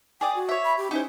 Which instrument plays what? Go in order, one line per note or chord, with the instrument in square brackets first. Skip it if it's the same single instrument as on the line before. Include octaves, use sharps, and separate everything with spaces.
[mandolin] G#4 D5 D#6 [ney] G5
[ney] F#4
[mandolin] C#5 E5
[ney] B5
G4
[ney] C#4 [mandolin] D#4 E4 C5